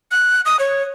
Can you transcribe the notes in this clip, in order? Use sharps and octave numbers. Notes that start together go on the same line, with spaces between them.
F#6
D#6
C#5